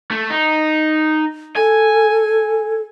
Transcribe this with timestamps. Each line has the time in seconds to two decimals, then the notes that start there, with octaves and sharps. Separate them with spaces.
0.11 A3
0.30 D#4
1.56 A4 G#5